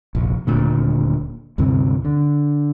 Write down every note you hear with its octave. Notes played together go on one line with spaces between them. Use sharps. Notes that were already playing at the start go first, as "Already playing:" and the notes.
F1 A#1
D#1 D2 A#2 D3
D2 G2 C3 E3
D3